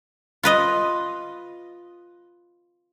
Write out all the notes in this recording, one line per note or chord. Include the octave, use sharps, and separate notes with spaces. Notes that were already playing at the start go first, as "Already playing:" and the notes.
F4 B4 D#5